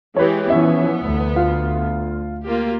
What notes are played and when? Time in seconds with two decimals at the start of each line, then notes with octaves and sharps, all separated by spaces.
0.16 E3 G#3 G4 B4 C#5
0.50 E3 F3 B3 C#4 E5
1.01 D2
1.36 F4
2.44 A#3 F4 G4